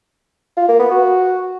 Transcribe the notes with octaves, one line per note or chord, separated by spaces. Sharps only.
F4
A#3
B3
F#4